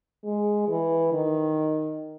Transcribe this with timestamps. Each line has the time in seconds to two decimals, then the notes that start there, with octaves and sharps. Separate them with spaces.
0.24 G#3
0.68 E3
1.13 D#3